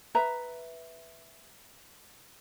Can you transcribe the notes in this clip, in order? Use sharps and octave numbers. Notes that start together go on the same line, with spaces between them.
B4 E5 A#5